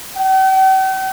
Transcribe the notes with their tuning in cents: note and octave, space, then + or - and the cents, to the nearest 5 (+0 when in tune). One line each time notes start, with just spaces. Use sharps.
G5 -45